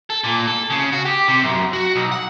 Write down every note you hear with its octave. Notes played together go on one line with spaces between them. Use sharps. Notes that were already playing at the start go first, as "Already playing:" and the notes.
A4
A#2
A4
C#3
F#4
G4
C3
F#2
F#4
B1
F#5